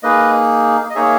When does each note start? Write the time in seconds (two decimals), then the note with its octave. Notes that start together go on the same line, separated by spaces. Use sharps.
0.03 A#3 D#4 G#4 B4 D#5
0.90 D#5
0.95 A#3 D#4 G#4 C#5 E5